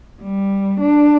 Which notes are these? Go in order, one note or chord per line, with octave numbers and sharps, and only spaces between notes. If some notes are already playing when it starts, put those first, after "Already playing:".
G3
D4